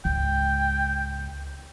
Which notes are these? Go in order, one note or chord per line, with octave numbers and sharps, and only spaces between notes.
C#2 G#2 G5